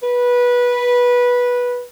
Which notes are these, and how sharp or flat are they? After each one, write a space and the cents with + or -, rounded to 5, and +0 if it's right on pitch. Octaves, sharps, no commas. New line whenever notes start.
B4 -15